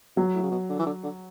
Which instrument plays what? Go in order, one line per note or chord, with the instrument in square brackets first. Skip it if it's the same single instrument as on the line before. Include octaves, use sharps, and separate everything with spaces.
[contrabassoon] B2 [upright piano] F#3
[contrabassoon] A2
C#3
B2
D3
E3
D3
D3